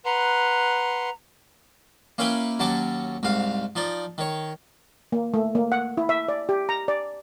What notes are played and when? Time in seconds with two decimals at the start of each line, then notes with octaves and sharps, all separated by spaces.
0.05 B4 F#5 A#5 C6
2.18 A#3 C#4 E4 B4 G5 G#5
2.60 D#2 F#3 C#4 A5 D6
3.23 C2 G#2 F5
3.76 F3 D#4 D5
4.18 D#3 C#5
5.12 A#3
5.34 A3
5.55 A#3
5.72 F#5
5.97 E4
6.09 E5
6.28 D5
6.49 G4
6.69 A#5
6.88 D5